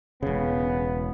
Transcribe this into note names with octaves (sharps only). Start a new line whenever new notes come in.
E1 C#3 B3